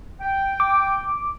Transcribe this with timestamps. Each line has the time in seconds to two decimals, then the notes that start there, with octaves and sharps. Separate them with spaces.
0.21 G5
0.60 D6